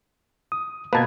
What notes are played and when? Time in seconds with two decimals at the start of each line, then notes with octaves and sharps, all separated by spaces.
0.52 D#6
0.93 B2 A#3 B4 A5 G#6